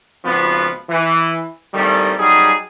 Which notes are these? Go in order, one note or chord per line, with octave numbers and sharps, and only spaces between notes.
G#1 C#2 F3 B3 F#4 B4
E3
G#1 A2 D#3 G3
F#3 G3 D#4 G#4